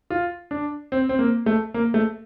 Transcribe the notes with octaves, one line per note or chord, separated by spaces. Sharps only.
F4
D4
C4
C4
A#3
A3
A#3
A3